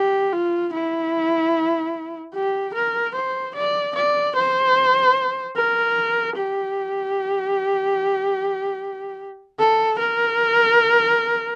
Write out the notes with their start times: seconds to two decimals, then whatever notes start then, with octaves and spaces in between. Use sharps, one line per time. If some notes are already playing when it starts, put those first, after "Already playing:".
Already playing: G4
0.33 F4
0.73 E4
2.34 G4
2.75 A#4
3.15 C5
3.56 D5
3.96 D5
4.36 C5
5.57 A#4
6.37 G4
9.59 A4
9.99 A#4